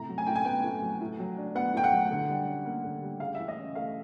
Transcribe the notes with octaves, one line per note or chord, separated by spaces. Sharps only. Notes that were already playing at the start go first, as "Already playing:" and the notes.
Already playing: A2 C3 A#5
F#3
G#5
A2 G5
G#5
B3 G5
A2
F#3
A2
F#3
D4
B3 F#5
A2 G5
F#5
F#3
D3
G3
C#4
A#3
D3
G3
C#3 F5
E3 E5
D#5
C#4
A3 F5